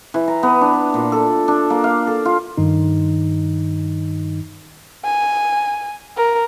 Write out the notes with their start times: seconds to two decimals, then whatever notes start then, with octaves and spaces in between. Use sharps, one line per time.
0.14 E3
0.28 A#5
0.43 B3
0.61 D4
0.94 A#2
1.12 A4
1.48 D4
1.70 A#3
1.84 F5
2.07 A4
2.25 F4
2.58 G2 D#3 D#4
5.04 G#5
6.17 A#4